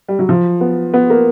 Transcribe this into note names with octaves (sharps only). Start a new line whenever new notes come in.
G3
F#3
F3
B3
B3
A#3